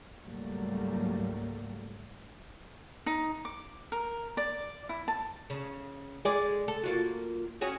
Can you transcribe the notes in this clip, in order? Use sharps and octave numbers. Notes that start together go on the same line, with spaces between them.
C#2 G#2 F#3 G3 A3 A#3
D#4
D6
A#4
D5
E4
A5
C#3
G#3 G#4 D5
A4
A#3 F4 F#4
C#4 F#4 G#4